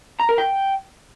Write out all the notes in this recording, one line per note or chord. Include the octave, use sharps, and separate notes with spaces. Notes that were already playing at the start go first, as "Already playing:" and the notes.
A#5
A#4
G5